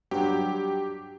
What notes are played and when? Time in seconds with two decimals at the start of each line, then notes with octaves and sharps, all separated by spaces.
0.11 G2 F#3 G4